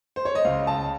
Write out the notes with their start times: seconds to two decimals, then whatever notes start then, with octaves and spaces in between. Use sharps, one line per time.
0.16 C5
0.25 C#5
0.35 D#5
0.45 C#2 F5
0.67 A5